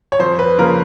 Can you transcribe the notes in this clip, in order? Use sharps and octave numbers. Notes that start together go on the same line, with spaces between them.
C#5
F2 C5
B4
C#3 F3 A#3 C#4 A#4